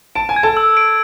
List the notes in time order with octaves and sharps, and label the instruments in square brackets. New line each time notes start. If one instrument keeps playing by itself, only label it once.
[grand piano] A5 [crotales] D7
[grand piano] G#5
[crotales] G#6
[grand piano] A4 A5
[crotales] E6
D7